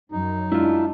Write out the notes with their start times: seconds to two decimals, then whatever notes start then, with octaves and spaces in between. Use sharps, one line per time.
0.12 F#2 D#4
0.52 F#3 G#3 D4 E4 F4